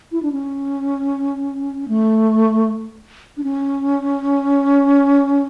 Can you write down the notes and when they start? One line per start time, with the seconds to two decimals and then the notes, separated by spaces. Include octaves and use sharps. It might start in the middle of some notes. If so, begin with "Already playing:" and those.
0.12 E4
0.23 D4
0.32 C#4
1.88 A3
3.37 D4
3.44 C#4